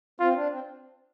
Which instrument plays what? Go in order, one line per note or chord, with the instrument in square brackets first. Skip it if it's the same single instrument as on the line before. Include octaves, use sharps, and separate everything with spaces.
[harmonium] C4 [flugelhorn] F4
[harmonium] D4
C4